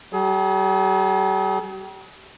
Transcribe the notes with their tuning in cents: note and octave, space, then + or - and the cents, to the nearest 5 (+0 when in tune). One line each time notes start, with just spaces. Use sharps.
G3 -40 G#4 +35